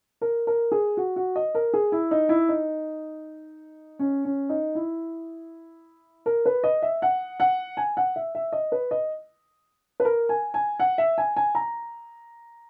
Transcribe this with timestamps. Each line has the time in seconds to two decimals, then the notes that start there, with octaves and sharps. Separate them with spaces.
0.21 A#4
0.47 A#4
0.72 G#4
0.97 F#4
1.16 F#4
1.36 D#5
1.55 A#4
1.73 G#4
1.92 E4
2.11 D#4
2.29 E4
2.49 D#4
3.99 C#4
4.25 C#4
4.49 D#4
4.75 E4
6.26 A#4
6.45 B4
6.64 D#5
6.82 E5
7.02 F#5
7.40 F#5
7.77 G#5
7.97 F#5
8.16 E5
8.35 E5
8.52 D#5
8.72 B4
8.91 D#5
10.00 B4
10.05 A#4
10.29 G#5
10.54 G#5
10.80 F#5
10.98 E5
11.18 G#5
11.36 G#5
11.55 A#5